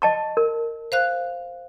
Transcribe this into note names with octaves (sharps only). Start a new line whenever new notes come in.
D#5 A5 C#6
A#4
C5 F5 F#6